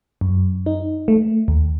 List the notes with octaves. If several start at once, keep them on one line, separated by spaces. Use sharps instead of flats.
F#2
D#4
A3
D#2